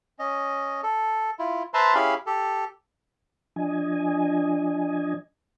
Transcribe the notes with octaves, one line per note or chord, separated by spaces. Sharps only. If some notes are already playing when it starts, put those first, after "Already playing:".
C#4 D#5
A4
E4 F4
B4 C5 E5 A5 A#5 C6
C#4 E4 G4 G#4 F5 B5
G4 A4
F3 D4 D#5 G#5